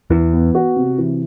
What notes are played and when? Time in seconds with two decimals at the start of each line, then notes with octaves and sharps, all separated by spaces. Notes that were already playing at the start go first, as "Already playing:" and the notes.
0.10 E2 E3
0.33 B3
0.55 F#4
0.76 C3
0.98 E3